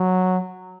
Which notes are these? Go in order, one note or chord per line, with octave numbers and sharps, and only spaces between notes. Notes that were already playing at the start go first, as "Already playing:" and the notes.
Already playing: F#3